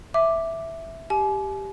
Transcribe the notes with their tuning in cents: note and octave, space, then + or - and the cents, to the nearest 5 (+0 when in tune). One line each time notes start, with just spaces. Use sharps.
E5 +0 D6 +0
G4 +0 G#5 +40